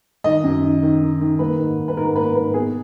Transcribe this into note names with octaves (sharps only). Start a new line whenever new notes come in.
D#3 D#5
F#2
D#3
D#3
D#3
D#3
A#3 B4
G#2
G#2
B4
G#2 A#4
A#3 B4
G#2 B4
B2 G#4